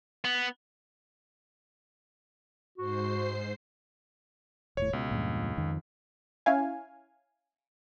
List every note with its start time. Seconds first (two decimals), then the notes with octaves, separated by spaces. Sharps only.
0.24 B3
2.78 G#2 F#4 C5 C7
4.77 D#1 A2 C#5
4.93 C#2 B2
5.11 E2 G2 A#2
5.57 F2 D#3 F3
6.46 C#4 E4 F5 G#5